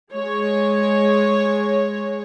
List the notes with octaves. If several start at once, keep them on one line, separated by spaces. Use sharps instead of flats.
G#3 C#5